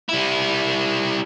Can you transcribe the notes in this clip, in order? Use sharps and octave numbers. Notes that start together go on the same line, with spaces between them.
G3 E4